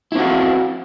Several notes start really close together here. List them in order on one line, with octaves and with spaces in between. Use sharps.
E4 C4 F#4 F5